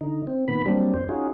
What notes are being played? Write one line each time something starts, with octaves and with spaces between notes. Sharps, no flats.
D3 D#4
C4
A#2 D#3 B3 B5
F#3 G3 A#3 C4 D4
F2 C5
C#4 D#4 F4 F#4 G#4